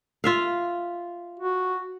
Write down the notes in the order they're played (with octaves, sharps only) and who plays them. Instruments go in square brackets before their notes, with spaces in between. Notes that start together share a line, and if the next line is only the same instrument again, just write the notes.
[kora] F4 E5 F5
[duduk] F#4